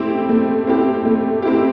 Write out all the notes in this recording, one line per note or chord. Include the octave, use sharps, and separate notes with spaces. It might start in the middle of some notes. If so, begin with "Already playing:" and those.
Already playing: A3 C4 E4 G4
A3
C4 E4 G4
A3
C4 E4 G4